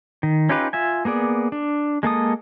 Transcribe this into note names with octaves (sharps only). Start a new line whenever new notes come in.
D#3
C#4 D#4 F4 G4 B4
F4 E5 G#5
A#3 B3 G#4 D5
D4
G#3 A#3 A4 D#6